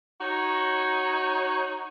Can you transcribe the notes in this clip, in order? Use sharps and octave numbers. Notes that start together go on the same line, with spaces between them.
D#4 F#4 C#5